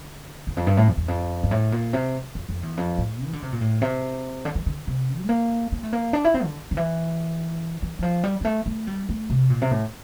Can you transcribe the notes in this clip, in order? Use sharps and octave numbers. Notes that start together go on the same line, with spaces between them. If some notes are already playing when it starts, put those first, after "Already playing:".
Already playing: D3
E2
F2
G2
A2
F2
E2
F2
G2
A2
A#2
C3
F2
F2
E2
F2
A2
E3
D3
C3
A#2
A2
C3
D3
E3
D3
C3
A3
A#3
A#3
A3
A#3
D4
E4
C4
D3
D3
E3
E3
E3
F3
G3
G3
A3
A3
G3
A3
C3
A#2
C3
A2